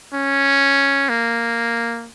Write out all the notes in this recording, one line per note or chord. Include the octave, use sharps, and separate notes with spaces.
C#4
A#3